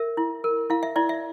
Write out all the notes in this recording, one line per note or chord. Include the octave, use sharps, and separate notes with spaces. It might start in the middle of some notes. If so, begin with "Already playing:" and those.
Already playing: A#4 E5
E4
A#4
E4 F5
E5
E4 D5
E5